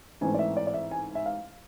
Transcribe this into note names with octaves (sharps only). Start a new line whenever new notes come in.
A1 G#2 E3 A3 C4 G#5
D5
E5
D5
D5
E5
G#5
E5
F5